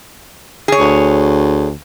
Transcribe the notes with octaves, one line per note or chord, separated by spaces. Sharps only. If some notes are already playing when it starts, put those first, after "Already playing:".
G#4 C#5
D2